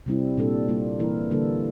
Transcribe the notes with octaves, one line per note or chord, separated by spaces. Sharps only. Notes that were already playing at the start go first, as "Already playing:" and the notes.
C3 G3 C4 E4
A#2 G3 D4 A4
G3 A#3 F4
E3 A#3 E4 A#4
D3 G3 A#3 D4 A4